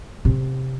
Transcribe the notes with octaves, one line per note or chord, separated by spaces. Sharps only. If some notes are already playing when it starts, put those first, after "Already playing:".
C3